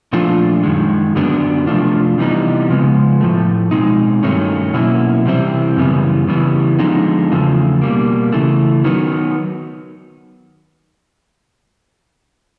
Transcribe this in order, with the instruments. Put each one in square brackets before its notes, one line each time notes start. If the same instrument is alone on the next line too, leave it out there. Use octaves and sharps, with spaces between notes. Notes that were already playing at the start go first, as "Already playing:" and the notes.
[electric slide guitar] A#2 F3 A3 D4 F4
F#2 D#3 G#3
F#2 D3 F#3 B3 D4
C3 F3 A3 D4 F4
C3 E3 G3 B3 D#4
C#3 F3 G#3 B3
A2 F3 A3
B2 G#3 C4 D#4
G2 D#3 F#3 A3 C#4
B2 F#3 A#3 C#4 E4
C3 E3 G3 C4 E4
F#2 C#3 E3 G3 B3
C#3 E3 G3 B3
D3 F3 G#3 B3 D#4
E2 C#3 F3 A3
B2 G3 A#3
C#3 E3 A3
D#3 F#3 B3